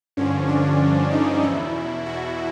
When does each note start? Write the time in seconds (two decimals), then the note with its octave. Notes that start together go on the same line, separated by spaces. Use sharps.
0.17 G2 D3 F3 C#4
0.48 D4
1.11 D#4
1.43 E2 B2 E4
2.06 F#4